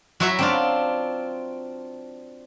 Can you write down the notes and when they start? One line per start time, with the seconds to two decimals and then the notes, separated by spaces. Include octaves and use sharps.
0.20 F#3 E4 F#4 C#5 E5 A#5
0.39 C4 D4 F4